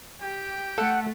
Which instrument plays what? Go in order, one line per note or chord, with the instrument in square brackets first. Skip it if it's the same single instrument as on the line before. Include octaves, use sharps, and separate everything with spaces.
[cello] G4 [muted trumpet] G5
[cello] A3 [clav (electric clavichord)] A4 [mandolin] F#5